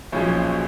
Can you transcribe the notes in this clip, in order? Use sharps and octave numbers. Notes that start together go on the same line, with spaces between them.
B1 A#2 F3 G#3 C#4